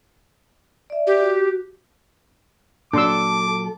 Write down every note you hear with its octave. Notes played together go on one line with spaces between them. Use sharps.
D5 E5
G4
F#4
A#2 F#3 D4 A4 C6 D6 E6